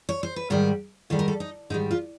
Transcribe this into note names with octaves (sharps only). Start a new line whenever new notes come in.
C#5
C5
B4
G#2 D#3 G3 A#4
G#2 D#3 G3 A4
A#4
A4
D#4
G#2 D#3 G3 D#4
F4